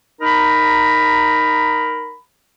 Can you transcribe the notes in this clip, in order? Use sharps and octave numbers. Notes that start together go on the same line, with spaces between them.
D#4 A#4 A#5 B5